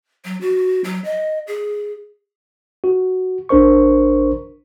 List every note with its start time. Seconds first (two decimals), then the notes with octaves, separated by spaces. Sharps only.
0.25 F#3
0.41 F#4
0.84 F#3
1.05 D#5
1.47 G#4
2.84 F#4
3.49 A1 D4 A#4 C5 C#6